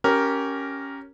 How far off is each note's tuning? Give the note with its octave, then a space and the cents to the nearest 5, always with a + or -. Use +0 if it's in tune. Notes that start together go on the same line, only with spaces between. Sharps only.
C#4 +0 G4 -15 A#4 +0